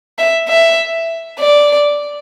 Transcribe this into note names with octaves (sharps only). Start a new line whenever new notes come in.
E5
E5
D5